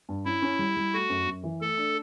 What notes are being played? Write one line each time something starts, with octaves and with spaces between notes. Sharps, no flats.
G2
C#4 E4
C#4
G3
G3
A3 F#4
F#2
F#2
E3
A3 A4
D4